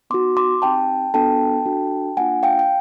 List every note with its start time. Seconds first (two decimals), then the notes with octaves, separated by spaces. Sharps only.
0.10 B3 D#4 F#4 C6 D6
0.37 C6 D6
0.62 C4 D#4 G4 G5 A5
1.14 B3 D4 F#4 A4 G5 A5
1.66 D4 F#4 A4
2.17 A#3 D4 F4 F#5 G#5
2.43 F5 G5
2.59 G5